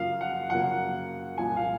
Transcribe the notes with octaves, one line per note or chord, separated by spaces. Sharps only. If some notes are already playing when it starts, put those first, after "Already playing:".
Already playing: F#2 C#3 F3 A#3 F5
F#5
F#2 C#3 F3 A#3 F#5
C2 A#2 F3 G#5
F5